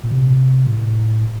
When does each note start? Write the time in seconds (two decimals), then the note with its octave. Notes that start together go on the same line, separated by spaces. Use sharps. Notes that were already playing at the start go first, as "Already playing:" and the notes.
0.03 A#2
0.11 C3
0.67 A2